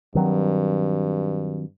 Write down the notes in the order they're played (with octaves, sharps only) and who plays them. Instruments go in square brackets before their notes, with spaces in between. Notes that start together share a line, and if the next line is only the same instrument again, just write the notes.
[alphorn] G2 [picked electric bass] D#3 F#3 C4